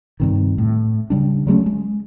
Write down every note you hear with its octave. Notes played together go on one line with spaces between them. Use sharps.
G2 C3 D#3
A2
C#3 G3 D4
F#3 G#3 A3 C#4
G#3